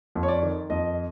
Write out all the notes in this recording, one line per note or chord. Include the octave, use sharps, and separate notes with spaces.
F2
C#5
D5
D#3
F2 D#5